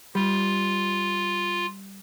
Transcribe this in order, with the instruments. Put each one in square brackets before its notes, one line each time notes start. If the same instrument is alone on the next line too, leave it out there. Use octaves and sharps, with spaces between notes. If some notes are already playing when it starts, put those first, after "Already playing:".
[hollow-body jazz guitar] G3 [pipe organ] F4